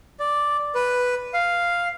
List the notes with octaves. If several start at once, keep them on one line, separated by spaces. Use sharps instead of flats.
D5
B4
F5